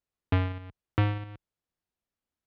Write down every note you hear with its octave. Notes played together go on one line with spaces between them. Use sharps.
F#2
G#2